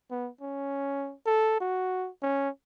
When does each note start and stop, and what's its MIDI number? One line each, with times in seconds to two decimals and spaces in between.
0.11 0.30 59
0.41 1.14 61
1.26 1.58 69
1.61 2.09 66
2.22 2.49 61